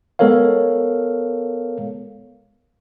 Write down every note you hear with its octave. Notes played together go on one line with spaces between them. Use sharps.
G#3 B3 A4 A#4 C#5 F5